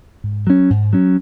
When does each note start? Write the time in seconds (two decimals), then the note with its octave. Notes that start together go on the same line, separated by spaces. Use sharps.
0.24 G#2
0.47 F#3 C#4
0.70 G#2
0.93 F#3 C#4